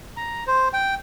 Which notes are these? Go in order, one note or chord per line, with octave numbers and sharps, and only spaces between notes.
A#5
C5
G5